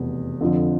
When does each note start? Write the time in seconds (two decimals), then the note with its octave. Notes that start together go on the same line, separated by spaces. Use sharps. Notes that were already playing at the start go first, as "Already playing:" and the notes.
Already playing: F1 E2 B2
0.41 F2 D3 F3